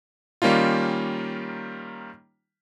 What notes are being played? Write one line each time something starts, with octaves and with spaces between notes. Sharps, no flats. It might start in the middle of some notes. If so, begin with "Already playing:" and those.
D#3 G3 A#3 C#4 D#4 F4